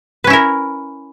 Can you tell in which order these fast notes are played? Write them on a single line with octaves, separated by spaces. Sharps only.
B4 C#4 E4 A#4